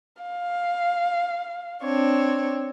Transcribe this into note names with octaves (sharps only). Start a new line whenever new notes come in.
F5
C4 D4 C#5